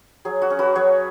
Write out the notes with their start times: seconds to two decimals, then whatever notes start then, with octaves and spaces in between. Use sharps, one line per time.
0.25 F#3 G#4
0.42 F#4
0.50 C#4
0.59 F#4 B4
0.75 F#3 G#4 C#5